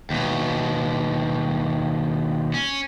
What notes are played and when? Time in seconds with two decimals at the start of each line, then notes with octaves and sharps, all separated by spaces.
0.10 D#2 B2
2.54 C#4